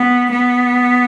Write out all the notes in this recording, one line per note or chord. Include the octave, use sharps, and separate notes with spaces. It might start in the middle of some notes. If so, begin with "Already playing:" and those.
Already playing: B3
B3